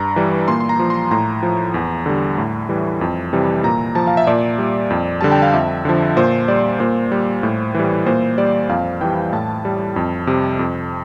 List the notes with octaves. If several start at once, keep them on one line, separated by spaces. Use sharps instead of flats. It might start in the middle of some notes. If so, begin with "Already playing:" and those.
Already playing: G2 A#5
E3 G3
A#2 C6
C6
A#5
F3
C6
A2 A#5
F3
E2
D3 G3
A2
E3 G3
F2
C3 E3 G3
A#2 A#5
F3 A5
F5
E5
A#2 D5
G3
F2
D3 G3 A5
G5
F5
F2 E5
D3 F3
A#2 C5
G3 D5
A#2 C5
G3
A2
E3 G3
A#2 C5
G3 D5
F2 F5
E3 G3 G5
A2 A5
G3
F2
C3 G3
F2